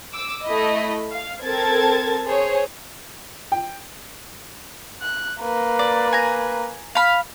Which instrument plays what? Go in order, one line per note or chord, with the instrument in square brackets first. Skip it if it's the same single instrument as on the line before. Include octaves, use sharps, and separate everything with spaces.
[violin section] D6 E6
A3 E4 D#5 B5
F5
C4 A4 A#4 A5 G#6 A6
G#4 C5 C#5
[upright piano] G5
[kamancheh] F#6
A#3 B4
[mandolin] D5
G#5 A#5
F5 B5